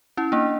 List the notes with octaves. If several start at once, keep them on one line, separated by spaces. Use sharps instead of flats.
C#4 E4
A#3 D4